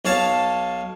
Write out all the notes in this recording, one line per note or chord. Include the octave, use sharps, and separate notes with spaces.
B1 C#5 F5 A5